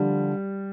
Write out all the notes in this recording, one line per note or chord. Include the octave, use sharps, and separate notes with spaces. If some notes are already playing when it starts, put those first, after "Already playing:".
Already playing: D3 F3 G3